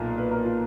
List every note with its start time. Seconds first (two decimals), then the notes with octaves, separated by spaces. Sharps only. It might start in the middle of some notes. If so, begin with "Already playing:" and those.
Already playing: B1 A#2 A#4
0.18 B4
0.31 A#4
0.44 F4